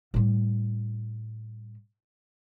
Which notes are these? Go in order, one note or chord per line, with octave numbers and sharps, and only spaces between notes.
A2 G3